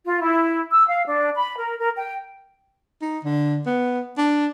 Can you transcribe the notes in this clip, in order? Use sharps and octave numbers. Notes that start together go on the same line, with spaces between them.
F4
E4
E6
F5
D4
B5
A#4
A#4
G5
D#4
D3
B3
D4